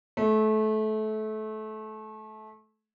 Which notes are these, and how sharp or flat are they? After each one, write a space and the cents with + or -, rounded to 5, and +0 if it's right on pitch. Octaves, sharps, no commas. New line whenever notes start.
A3 -25